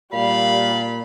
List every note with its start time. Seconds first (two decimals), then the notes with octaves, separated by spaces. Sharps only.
0.13 A#2 G3 F5 B5